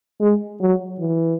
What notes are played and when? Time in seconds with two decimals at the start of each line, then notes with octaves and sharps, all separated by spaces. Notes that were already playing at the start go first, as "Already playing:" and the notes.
0.21 G#3
0.61 F#3
0.99 E3